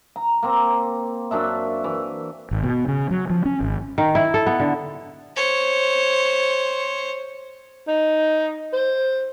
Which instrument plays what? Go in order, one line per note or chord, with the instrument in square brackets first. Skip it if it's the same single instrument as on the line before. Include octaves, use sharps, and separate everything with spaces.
[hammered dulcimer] A#5
A#3 C4 A#5
F#2 D4 E5
E3
[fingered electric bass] G#1
B2
C#3
F#3
F3
C#4
G#1
[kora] D#3
E4
A4
B3
D3
[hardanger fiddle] C5 C#5
[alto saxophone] D#4
C5